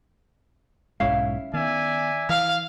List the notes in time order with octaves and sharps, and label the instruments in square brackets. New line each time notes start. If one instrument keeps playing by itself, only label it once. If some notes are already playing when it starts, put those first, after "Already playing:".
[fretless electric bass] B1 G#2 G#3 [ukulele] C#4 E4 F5
[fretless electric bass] D#3 B3 [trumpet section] D5 E5 G#5
[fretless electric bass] E3 [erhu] F5